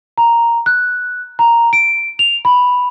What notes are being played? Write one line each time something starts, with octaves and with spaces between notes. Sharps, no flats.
A#5
F#6
A#5
D7
F7
B5